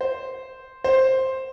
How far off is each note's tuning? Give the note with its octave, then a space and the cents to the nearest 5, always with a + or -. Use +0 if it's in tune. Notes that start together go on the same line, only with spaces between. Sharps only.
C5 -5
C5 +5